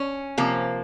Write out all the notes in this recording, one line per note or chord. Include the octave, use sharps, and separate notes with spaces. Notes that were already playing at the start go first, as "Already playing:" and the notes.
Already playing: C#4
C3 F3 A#3